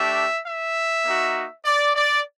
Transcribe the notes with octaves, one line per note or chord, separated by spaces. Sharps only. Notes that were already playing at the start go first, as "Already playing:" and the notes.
Already playing: A3 D4 G4 E5
E5
A#3 D#4 F#4
D5
D5